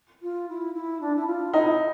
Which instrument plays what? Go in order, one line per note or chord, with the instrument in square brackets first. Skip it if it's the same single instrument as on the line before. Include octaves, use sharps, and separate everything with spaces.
[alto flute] F4
E4
E4
D4
E4
F4
[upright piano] D#4 [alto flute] E4